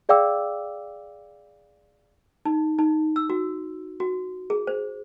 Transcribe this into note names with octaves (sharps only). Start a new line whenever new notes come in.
G#4 D5 F5 G5 D6 E6
D#4
D#4
E6
F#4
F#4
G#4
C5